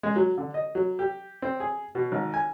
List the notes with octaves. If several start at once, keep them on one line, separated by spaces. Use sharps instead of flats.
G#3
F#3
D3
D#5
F#3
G4
C4
G#4
B2
G#1
G#5